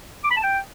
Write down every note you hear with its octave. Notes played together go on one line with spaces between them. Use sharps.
D6
B5
A5
G5